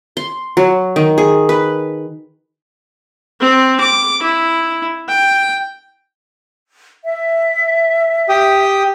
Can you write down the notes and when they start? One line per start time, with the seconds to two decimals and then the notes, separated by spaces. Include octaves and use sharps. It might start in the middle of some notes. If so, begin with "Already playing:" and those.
0.17 C6
0.57 F#3
0.96 D#3
1.18 G#4
1.49 B4
3.40 C4
3.80 D6
4.22 E4
5.09 G5
7.04 E5
8.29 G4 G5 D#6